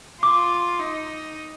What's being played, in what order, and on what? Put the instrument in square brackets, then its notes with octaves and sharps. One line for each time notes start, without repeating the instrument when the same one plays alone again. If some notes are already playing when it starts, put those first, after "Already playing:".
[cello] F4 [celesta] D6
[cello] D#4